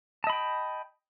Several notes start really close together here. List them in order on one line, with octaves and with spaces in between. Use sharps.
A5 D#5 B5 G5